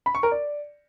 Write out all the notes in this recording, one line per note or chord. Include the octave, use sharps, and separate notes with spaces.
B5
C#6
A#4
D5